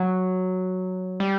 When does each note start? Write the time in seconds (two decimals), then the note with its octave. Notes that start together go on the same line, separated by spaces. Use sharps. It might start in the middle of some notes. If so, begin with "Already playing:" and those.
Already playing: F#3
1.20 G3